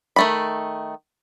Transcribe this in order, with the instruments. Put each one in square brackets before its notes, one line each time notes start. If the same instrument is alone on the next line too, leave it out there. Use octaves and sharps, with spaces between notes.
[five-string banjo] D#3 A3 B5